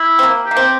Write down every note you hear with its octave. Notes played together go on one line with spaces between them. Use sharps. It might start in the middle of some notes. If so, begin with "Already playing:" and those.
Already playing: E4
C4
A#3
G4
A#3
C4